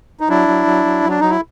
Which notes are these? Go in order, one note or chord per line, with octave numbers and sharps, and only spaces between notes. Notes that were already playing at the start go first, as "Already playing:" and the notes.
D#4
F#3 D4 E4
F#3
F#3
F#3
F#3
D4
F#3 D#4
E4